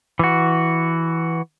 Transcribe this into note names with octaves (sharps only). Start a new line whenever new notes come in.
E3 F#4